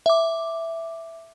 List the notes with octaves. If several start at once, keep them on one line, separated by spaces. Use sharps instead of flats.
E5 D6